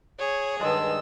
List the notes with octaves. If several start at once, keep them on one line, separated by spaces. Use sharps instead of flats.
G#4 C#5
G2 D#3 G#3 D#5 A5 E6